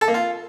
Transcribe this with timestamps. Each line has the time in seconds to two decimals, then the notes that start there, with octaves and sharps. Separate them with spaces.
0.01 A4
0.08 A#3
0.14 F4